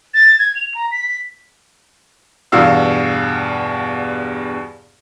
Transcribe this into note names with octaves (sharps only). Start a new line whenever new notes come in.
A6
G#6
F7
A#5
B6
E2 G2 B2 F5 E6